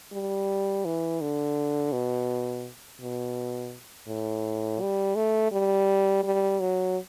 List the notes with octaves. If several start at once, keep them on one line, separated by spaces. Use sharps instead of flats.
G3
E3
D3
B2
B2
A2
G3
A3
G3
G3
F#3